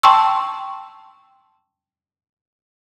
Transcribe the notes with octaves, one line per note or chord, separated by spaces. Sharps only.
G5 A5 C6 C#6 E6